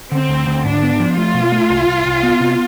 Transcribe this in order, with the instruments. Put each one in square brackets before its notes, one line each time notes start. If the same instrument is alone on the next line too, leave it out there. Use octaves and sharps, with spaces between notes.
[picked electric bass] D3 [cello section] C4
[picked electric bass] D2
D3
[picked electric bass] G#2 [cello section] D4
[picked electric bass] B3
F3
[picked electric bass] A3 [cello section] F4
[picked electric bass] B2
A3
C2
C2
C2
B3
C3